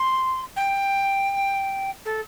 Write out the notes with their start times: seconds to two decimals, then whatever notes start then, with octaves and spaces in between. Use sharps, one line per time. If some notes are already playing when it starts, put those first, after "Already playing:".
Already playing: C6
0.56 G5
2.05 A4